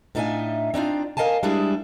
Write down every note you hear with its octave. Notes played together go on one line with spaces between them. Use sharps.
A2 D4 D#4 F4 E5 G#5
C4 D4 D#4 F4
A#4 D#5 F5 G#5 A5
G3 G#3 D4 E4 G#4